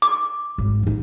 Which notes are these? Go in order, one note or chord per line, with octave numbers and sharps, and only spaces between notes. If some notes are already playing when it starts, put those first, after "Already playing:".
D6
G#1
A1 D#4